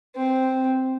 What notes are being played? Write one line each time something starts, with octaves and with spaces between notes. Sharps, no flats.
C4